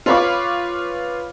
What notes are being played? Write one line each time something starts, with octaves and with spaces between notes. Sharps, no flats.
F4 B4 C#5 F5 B5 D6